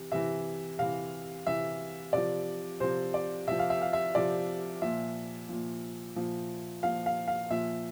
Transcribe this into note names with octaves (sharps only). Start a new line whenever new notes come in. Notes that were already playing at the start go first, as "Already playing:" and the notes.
Already playing: C3 E3
C3 E3 E5
C3 E3 F5
C3 E3 E5
C3 F3 D5
C3 F3 C5
D5
C3 F3 E5
F5
E5
F5
E5
C3 F3 D5
A#2 F3 E5
A#2 F3
A#2 F3
A#2 F3 F5
F5
F5
A#2 F3 E5